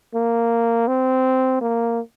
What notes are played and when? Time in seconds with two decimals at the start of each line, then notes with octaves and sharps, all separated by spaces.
0.14 A#3
0.88 C4
1.61 A#3